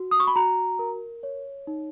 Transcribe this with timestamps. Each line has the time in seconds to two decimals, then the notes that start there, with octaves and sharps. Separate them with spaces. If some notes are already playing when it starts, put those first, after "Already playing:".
Already playing: F#4
0.11 D#6
0.20 C#6
0.27 B5
0.36 F#4 A#5
0.79 A#4
1.23 C#5
1.67 D#4